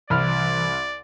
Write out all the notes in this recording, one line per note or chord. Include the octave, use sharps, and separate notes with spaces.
C2 E3 D5 B5 F6